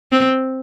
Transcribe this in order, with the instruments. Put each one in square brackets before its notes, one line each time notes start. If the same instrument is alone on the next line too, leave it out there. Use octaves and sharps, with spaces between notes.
[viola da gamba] C4